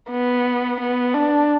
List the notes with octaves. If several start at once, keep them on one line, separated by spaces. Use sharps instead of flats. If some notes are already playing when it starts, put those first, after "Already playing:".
B3
B3
D4